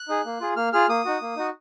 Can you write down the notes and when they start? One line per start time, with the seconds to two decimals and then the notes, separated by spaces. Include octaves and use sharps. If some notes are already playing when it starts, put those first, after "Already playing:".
Already playing: F#6
0.09 D#4 G#4
0.25 A#3
0.41 F4 G#4
0.56 A#3 F6
0.73 F4 G#4 F6
0.89 A#3 D#6
1.05 D#4 F#4
1.22 A#3
1.36 D#4 F#4